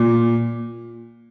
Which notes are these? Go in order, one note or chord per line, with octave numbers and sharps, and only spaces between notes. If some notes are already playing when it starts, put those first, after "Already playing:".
Already playing: A#2